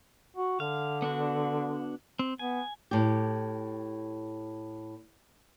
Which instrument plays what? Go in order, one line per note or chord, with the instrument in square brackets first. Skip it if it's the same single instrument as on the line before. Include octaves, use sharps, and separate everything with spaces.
[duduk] F#4
[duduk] D3 [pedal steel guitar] F5
[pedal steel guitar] B3 D4 F#4
C4
[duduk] B3 [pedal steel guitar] G#5
[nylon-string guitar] A2 G4